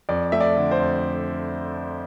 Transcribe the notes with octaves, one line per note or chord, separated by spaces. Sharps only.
F2 D5
A3 E5
D5
D3
C5
F2